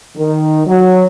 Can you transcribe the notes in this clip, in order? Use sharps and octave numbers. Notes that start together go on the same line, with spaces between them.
D#3
F#3